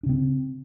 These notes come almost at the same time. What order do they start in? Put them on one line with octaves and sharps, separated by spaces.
D4 C#3 C4